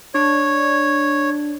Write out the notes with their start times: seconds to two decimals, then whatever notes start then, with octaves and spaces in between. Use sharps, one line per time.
0.14 D4 C#5